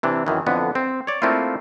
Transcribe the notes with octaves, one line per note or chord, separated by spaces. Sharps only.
C3 E3 D4
F#2 D#3 E3
F2 D3 E3 B3
C4
C#5 D5
A3 A#3 C4 D4 E4 F4